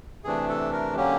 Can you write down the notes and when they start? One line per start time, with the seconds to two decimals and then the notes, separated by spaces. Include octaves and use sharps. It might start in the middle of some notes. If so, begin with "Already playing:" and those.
0.24 C3 E3 A3 D4 G#4
0.49 A4
0.73 A#4
0.96 D3 F#3 A#3 C#4 G4